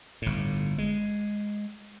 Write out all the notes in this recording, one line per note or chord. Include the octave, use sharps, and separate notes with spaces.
G1 A2
G#3